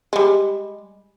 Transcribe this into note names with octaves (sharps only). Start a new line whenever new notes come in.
G3 G#3